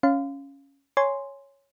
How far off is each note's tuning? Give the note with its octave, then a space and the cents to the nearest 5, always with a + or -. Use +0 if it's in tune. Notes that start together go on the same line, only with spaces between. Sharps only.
C#4 +0 F5 +0 C6 -35
C#5 +0 G#5 +0 C6 +0